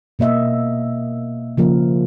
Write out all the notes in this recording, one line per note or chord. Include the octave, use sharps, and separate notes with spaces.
B2 A#3 D#5 E5
C#3 F3 A#3 A#4